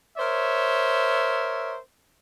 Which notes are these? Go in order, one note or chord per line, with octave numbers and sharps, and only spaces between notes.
A#4 C5 C#5 E5